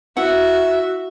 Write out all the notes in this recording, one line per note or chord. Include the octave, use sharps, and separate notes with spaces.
E4 F#4 E5 F#5